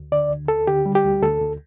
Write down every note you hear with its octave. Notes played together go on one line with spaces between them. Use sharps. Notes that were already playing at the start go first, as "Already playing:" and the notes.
Already playing: D2
D3 D5
D2
D2 A4
D3 G4
G3
G4
D2
D2 A4
D2